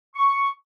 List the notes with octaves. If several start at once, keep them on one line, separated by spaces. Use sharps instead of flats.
C#6